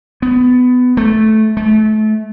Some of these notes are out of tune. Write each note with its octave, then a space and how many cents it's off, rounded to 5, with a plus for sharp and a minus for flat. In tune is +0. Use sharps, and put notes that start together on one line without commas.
B3 +20
A3 -10
A3 -30